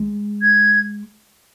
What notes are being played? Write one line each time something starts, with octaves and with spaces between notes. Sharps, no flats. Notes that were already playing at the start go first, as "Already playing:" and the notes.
Already playing: G#3
G#6